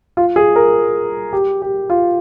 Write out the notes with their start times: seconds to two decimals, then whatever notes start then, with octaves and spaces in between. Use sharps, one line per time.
0.17 F4
0.36 G#4
0.56 A#4
1.33 G4
1.62 G4
1.90 F4